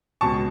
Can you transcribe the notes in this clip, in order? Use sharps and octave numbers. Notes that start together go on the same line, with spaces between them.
C#2 B2 A5 C#6